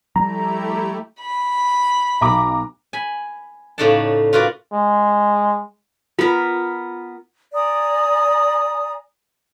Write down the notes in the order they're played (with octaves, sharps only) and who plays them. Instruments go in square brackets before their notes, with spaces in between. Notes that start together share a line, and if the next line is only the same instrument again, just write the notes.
[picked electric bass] F3 G3 [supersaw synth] A3 E4 G4 [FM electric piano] A#5
[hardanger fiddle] B5
[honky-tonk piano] B1 A#5 D6
[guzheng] G#5 B5
A2 C#3 D#4 D5 F#5 A5
F4 F#4 A#4 B4 D5
[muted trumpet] G#3
[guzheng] B3 A#4 [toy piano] F4
[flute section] D5 G#5 A#5 D#6